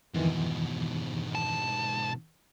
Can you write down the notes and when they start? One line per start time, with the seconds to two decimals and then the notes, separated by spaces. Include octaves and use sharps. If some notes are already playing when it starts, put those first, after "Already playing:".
0.14 F2 G#2 B2 D#3 E3
1.35 A5